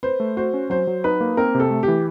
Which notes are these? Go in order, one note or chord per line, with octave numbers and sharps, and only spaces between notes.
B4 C5
A3
F#4 C5
C#4
F#3 C5
F#3
D#4 B4
A#3
C4 A#4
C3
A4
A3
G4
E3